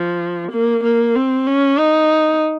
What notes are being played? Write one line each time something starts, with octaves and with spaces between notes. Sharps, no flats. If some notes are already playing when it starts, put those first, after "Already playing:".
Already playing: F3
A#3
A#3
C4
C#4
D#4